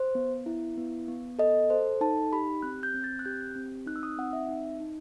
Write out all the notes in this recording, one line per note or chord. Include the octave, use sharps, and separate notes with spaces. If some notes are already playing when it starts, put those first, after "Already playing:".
Already playing: C5
B3
E4
B3
B3
A4 D#5
A4 C5
D#4 A5
G4 B5
C4 F#6
G6
C4
A6
F#6
G4 G6
C4
D#4 F#6
E6
D#6
C4 F#5
E5
D#4
D#4